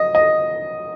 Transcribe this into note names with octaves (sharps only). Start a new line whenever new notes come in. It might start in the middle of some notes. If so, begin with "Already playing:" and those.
Already playing: D#5
D#5